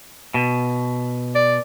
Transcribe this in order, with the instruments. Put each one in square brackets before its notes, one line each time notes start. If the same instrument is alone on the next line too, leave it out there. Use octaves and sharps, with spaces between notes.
[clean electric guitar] B2
[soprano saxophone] D5